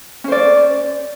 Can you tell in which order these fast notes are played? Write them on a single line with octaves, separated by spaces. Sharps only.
C#4 C5 D5